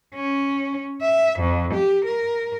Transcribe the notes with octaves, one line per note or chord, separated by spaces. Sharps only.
C#4
E5
F2
G4
A#4